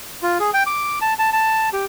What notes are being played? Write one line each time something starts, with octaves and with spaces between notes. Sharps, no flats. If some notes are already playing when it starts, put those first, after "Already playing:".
F4
G#4
G5
D6
A5
A5
A5
G4